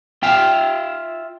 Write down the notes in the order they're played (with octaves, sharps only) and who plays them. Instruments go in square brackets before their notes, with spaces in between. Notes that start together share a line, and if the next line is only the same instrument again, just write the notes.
[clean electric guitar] F4 E5 F5 [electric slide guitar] G5